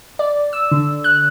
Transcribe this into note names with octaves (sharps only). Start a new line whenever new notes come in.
D5
E6
D3
F#6